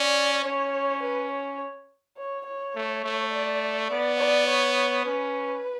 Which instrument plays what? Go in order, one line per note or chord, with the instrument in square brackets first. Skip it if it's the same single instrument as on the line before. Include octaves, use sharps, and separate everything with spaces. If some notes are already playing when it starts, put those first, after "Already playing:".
Already playing: [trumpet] C#4 [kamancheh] D5
[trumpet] C#4 [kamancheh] C#5
[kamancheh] B4
C#5
C#5
C#5
[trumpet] A3
A3
[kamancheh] D5
[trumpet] B3 [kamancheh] D5
[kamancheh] D5
C#5
[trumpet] C#4 [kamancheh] B4